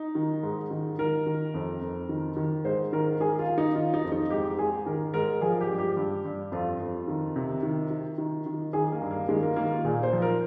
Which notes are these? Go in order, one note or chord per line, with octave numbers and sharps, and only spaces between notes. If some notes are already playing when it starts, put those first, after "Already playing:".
Already playing: D#4
D#3
G#2
D#3
D#3 A#4
D#3
F2
F2
D#3
D#3
G#2 C5
D#3 A#4
D#3 G#4
F4
D#3
D#4
D#3 F4
D#4
F2
D#4
G#2 G4
G#2 G#4
D#3 A#4
G#2 A#4
F3 G#4
G4
G2
G4
G2
G2
F2 F4
F2
D#3
C3
D#3
D#3
D#3
D#3
D#3 G#4
A#3
G2
A#3
D#3 G#3
A#3
D#3 A#3
F4
A#2 G#4
C5
F3
A#4